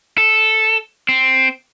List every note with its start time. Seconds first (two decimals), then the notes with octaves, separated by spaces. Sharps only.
0.18 A4
1.09 C4